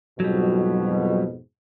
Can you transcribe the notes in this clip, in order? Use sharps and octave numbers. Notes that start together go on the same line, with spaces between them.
F2 G#2 B2 F#3 G3